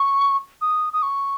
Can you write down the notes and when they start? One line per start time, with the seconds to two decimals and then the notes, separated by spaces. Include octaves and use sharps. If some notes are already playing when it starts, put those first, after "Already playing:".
Already playing: C#6
0.62 D#6
0.93 D#6
1.03 C#6